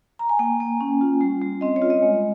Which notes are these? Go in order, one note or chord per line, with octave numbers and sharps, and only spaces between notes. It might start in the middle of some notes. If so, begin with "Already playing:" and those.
A#5
G#5
A#3 G5
A#3
C#4
F4
G3
G3
C4 D#5
C#5
F4
D#5
G#3